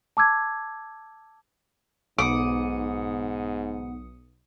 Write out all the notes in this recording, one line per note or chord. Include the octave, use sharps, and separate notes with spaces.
A5 D6 E6 G#6
B1 G#2 B3 F#5 D6 D#6 C#7